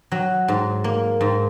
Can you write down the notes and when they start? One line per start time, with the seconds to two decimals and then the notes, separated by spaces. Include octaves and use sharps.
0.12 F#3
0.48 G#2
0.84 A#3
1.21 G#2